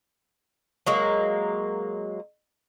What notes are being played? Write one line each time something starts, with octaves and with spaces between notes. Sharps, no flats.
F#3 G#3 A#3